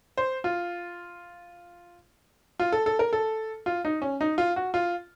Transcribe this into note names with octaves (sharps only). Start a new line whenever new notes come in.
C5
F4
F4
A4
A4
A#4
A4
F4
D#4
C#4
D#4
F4
F#4
F4